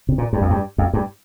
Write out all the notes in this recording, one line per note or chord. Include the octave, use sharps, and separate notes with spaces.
C3
A#2
G2
F2
G2
F2
G2